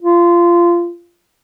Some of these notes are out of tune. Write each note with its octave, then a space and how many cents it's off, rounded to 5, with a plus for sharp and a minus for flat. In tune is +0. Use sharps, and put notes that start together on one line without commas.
F4 -20